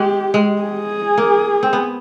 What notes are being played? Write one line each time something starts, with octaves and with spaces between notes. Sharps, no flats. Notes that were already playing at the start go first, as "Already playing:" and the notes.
Already playing: G#3 G4
G#3
G#4
A#3
C4
B3